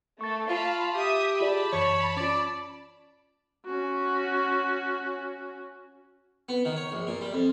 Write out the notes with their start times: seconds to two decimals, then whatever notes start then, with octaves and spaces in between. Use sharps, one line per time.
0.21 A3 A4 C#6 A6
0.50 F4 F5 A5 B5
0.95 G4 E5 D#6
1.41 F4 G#4 D5 A5 B5
1.73 F#2 E3 C#5
2.17 C#4 F4 D5
3.66 C#4 F#4
6.49 B3
6.65 D#3
6.76 C#5
6.92 A#1
7.07 A#2
7.21 G3
7.33 F2